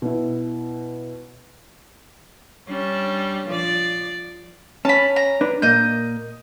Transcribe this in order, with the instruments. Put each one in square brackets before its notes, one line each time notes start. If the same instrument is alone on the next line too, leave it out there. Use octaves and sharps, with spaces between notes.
[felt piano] B2 E4
[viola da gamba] G3 C#4 D4
F3 D5
[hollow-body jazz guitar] C#4 [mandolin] A5 B5
[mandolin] A#5
[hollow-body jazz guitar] D4 B4
[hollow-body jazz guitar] A#2 A#3 [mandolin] D#5 G6